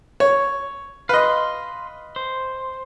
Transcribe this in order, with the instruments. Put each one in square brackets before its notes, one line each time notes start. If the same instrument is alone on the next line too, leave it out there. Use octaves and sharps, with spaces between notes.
[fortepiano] C#5
[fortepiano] B4 D#5 [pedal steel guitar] F5 C6
[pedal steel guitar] C5